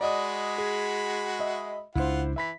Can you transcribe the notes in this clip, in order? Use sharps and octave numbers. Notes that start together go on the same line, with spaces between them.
G#3 F#4 D5 D#5 B5 D#6
G#4
D#5 E5
C#2 G#3 D4 E4 F4 C5 F#5
E3 E5 B5 B6